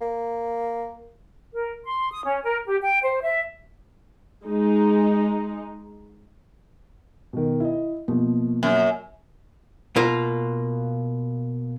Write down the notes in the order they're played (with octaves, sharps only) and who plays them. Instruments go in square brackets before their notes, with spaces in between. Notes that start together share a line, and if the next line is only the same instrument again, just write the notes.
[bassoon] A#3
[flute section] A#4
C6
D#6
C#4
A#4
G4
G5
C5
E5
[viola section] G#3 D#4
[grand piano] B2 D#3
E4 D#5
[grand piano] B2 F3 [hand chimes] A#3
[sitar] F#2
[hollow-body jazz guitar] B2 A#3 F4